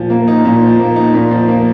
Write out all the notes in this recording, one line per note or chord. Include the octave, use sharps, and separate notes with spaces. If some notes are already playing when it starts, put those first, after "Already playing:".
Already playing: A#2 F3
A#3
D#4
A#2
F3
A#3
D#4
A#2
F3
A#3